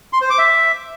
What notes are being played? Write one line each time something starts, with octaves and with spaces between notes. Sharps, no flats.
C6
C5
D6
E5